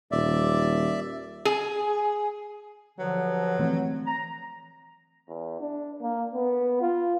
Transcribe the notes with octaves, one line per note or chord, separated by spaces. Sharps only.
D#1 D5 E5
G#4
G2 D3 F3 F#3
E3 A3 C4
A#5
E2
D4
A#3
B3
F4